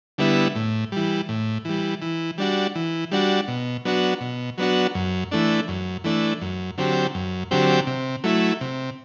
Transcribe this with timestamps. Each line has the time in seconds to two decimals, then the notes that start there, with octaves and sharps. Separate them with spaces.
0.18 D3 G3 B3 E4
0.55 A2
0.92 E3 G3
1.29 A2
1.65 E3 G3
2.02 E3
2.38 G3 D4 F#4
2.75 E3
3.11 G3 D4 F#4
3.48 B2
3.85 F#3 B3 D4 F#4
4.21 B2
4.58 F#3 B3 D4 F#4
4.95 F#2
5.32 E3 A3 D4
5.68 F#2
6.04 E3 A3 D4
6.41 F#2
6.78 D3 F#3 C4 G4
7.14 F#2
7.51 D3 F#3 C4 G4
7.87 C3
8.24 F#3 A3 E4
8.61 C3